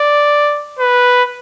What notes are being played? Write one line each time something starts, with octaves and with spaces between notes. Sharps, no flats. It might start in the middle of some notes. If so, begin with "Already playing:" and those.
Already playing: D5
B4